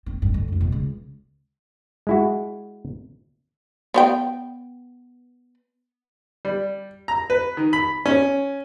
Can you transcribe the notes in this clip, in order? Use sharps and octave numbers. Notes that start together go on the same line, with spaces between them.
C4
G2
D2
F2 F3
B2
C#2
G#3 E4 F#4
B3 C#5 G5
G3
A#5
B4
D#3
B5
C#4